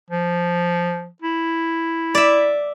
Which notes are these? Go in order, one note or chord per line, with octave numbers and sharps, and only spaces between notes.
F3
E4
D5 E5